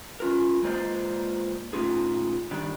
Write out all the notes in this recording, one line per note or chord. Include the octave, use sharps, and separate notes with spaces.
C#4 F4 A#4
G#3 A#3 F4 C5 D5 D#5
A#2 A3 C#4 D#4 F4 G#4
D#3 G3 D4